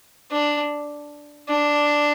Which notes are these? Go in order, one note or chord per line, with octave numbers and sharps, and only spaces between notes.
D4
D4